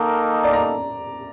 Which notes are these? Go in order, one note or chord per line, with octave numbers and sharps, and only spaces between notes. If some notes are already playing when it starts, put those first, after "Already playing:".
Already playing: D#3 A#3 D#4 A4 A#4
D5
A#5